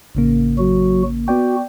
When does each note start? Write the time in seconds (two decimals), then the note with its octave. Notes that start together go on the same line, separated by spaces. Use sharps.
0.15 A1 C#3 A#3
0.58 F#3 F#4
1.28 B3 F#4 D5 G5